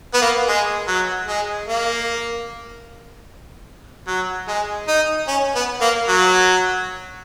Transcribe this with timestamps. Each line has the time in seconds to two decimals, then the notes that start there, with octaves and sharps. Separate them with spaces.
0.14 B3
0.22 A#3
0.48 G#3
0.88 F#3
1.28 G#3
1.68 A#3
4.07 F#3
4.48 G#3
4.88 D#4
5.28 C#4
5.55 B3
5.81 A#3
6.08 F#3